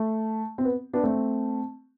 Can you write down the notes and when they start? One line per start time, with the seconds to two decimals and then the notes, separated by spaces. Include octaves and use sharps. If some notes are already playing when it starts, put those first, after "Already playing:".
Already playing: A3
0.58 C4
0.64 B3
0.93 B3 D4
1.04 A3 C4